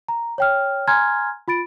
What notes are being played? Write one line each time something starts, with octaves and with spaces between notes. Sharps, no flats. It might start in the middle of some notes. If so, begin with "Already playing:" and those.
A#5
C#5 G5 F6
G#5 A#5 C6 F6 G#6
F4 B5 A6 D7